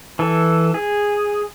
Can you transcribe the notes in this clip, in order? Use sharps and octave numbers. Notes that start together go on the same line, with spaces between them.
E3 A4
G#4